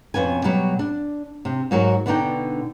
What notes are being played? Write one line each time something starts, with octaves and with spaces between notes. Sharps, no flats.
F2 B2 B3 C#4 G#5
B2 F#3 G3
D4
C3
G#2 F#3 F#4 A#4
B2 D3 B3 D4 D#4 G5